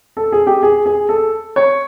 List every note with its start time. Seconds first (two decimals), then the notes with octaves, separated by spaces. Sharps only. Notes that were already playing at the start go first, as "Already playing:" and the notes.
0.17 A4
0.32 G#4
0.47 G4
0.63 G#4
0.86 G#4
1.09 A4
1.56 C#5